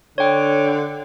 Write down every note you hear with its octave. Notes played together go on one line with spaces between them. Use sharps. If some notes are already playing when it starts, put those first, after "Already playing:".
D3 C#5 G5